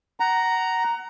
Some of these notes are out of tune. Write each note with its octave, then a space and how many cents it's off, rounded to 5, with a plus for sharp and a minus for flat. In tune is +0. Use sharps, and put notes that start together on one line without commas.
F#5 +20 A#5 +0